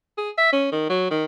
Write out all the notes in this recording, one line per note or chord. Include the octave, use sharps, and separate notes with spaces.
G#4
E5
C#4
D#3
F#3
D#3